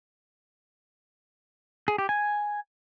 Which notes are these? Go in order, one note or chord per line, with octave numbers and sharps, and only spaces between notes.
G#4
G4
G#5